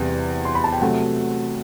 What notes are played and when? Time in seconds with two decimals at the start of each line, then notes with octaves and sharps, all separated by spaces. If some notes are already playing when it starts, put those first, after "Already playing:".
Already playing: E2 C3 G3
0.45 C6
0.55 B5
0.64 A5
0.72 G5
0.81 C3 F#3 A3 F#5